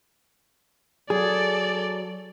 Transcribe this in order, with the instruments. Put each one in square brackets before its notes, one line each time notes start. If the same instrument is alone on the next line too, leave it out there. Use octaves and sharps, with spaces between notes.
[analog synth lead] F#3 [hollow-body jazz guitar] G#4 [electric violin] A4 D5